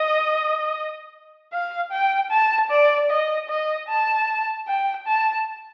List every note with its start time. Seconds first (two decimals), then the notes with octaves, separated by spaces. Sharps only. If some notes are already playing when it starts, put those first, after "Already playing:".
Already playing: D#5
1.53 F5
1.92 G5
2.31 A5
2.71 D5
3.10 D#5
3.49 D#5
3.89 A5
4.67 G5
5.07 A5